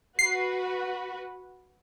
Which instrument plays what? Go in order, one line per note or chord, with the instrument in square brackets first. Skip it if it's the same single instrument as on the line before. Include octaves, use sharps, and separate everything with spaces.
[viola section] F#4 B4 [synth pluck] C7